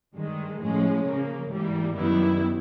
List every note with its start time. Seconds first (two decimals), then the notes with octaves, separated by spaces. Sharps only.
0.15 G2 D#3 G#3
0.61 A2 F3 G#3 C#4
1.05 C#3 F3 A#3
1.50 G#2 E3 G3 A#3
1.96 F#2 D#3 G3 B3 E4